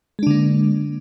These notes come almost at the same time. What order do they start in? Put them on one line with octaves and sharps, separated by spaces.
G#3 D4 D3 A#3